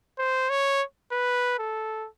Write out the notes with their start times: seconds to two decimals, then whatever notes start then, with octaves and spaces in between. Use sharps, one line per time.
0.18 C5
0.50 C#5
1.12 B4
1.59 A4